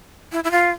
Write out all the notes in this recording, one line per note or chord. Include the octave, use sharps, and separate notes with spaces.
E4
E4
F4